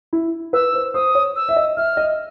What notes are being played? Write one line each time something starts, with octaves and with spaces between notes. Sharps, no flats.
E4
B4 E6
C5
C5 D#6
C#5
E6
E5
D#5
E5 F6
D#5